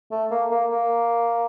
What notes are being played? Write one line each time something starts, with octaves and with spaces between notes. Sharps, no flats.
A3
A#3
A#3
A#3